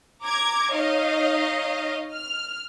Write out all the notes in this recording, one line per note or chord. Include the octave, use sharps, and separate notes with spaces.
A#5 D6 G#6
D#4 C#5 D#5 F5
F6